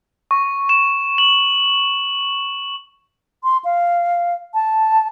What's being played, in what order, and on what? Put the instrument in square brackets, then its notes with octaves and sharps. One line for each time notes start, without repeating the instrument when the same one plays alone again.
[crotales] C#6
E7
F#7
[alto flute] C6
F5
A5